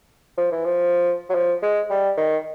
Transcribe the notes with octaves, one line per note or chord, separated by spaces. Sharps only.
F3
E3
F3
F#3
F3
G#3
G3
D#3